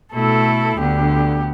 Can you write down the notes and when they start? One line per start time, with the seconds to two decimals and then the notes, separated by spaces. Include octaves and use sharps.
0.13 B2 A3 E4 A4
0.77 D2 D3 B3 G4